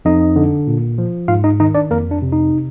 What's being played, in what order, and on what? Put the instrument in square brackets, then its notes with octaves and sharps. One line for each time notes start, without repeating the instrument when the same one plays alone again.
[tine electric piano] F2 D#4 D#5
D3
A#2
F3
G#2 F4 F5
D#4 D#5
D#3 D#4 D#5
D4 D5
F2 A#3 A#4
D4
C3
D#4